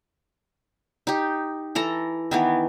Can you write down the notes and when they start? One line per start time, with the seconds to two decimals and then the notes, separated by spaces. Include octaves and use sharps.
1.07 D#4 G4
1.75 E3 A4 A#5
2.31 D#3 E3 B3